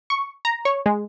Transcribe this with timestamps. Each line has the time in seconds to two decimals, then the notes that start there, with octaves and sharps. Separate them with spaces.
0.10 C#6
0.45 A#5
0.65 C#5
0.86 G#3